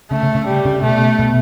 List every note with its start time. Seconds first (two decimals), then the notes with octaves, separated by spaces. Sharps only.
0.11 C#3 A3 C#4
0.23 C#3 C#4
0.35 C#3 C#4
0.47 G3
0.65 C#3 C#4
0.83 B2 A3 B3
1.19 B2 B3